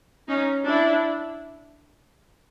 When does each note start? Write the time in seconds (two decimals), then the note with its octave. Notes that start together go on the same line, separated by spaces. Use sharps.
0.28 C#4 D#4
0.66 D4 E4